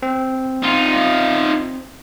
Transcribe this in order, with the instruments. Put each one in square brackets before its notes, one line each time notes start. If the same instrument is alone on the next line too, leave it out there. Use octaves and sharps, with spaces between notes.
[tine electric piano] C4
[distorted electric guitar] D#4 F4